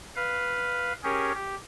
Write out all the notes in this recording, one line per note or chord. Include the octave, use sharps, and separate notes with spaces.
B4 F5
C#4 G4 G#4 A#4 C#5
G4